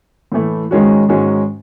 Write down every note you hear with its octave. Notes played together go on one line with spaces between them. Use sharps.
A2 E3 A3
G#2 D#3 G#3 C#4 F#4
G#2 D#3 G#3 C#4 F#4